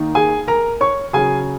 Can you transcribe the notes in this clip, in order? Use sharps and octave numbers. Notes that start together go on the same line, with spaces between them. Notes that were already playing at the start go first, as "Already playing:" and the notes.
Already playing: D#3 A#3 D#4
G#4 G#5
A#4 A#5
C#5 C#6
C#3 F#3 C#4 G#4 G#5